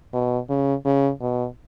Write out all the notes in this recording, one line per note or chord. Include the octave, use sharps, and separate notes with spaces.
B2
C#3
C#3
B2